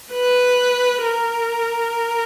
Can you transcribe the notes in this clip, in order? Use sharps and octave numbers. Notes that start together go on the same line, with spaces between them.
B4
A#4